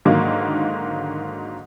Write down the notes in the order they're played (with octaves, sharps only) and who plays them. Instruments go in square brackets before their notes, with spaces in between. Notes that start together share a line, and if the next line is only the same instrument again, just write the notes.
[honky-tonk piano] G#2 D3 D#3 F#3 A#3